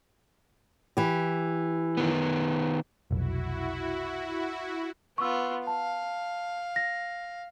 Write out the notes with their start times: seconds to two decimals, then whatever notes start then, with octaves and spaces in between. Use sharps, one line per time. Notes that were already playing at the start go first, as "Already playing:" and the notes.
0.97 E3 G4
1.97 D#3 B3
3.11 F1 B1 E4 F#4
5.18 B3 F4 C#6 E6
5.67 F5 A5
6.76 A#6